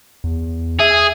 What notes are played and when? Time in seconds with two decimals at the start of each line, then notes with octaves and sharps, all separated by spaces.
0.24 E2
0.80 G#4 E5